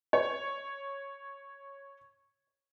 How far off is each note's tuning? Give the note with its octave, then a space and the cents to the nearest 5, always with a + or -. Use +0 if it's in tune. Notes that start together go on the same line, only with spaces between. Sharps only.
C#5 -5